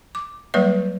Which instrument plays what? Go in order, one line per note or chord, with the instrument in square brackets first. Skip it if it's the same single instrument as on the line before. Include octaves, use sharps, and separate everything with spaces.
[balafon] D6
F#3 G3 A#3 B4 E5